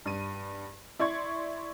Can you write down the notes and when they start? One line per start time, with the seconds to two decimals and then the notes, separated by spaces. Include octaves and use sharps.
0.06 G2 D#7
0.99 E4 D5 C6 C#6 G#6